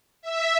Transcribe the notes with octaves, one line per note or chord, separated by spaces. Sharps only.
E5